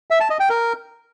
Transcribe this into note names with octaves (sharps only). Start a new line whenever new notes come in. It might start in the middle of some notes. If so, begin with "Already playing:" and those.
E5
A5
D#5
G5
A#4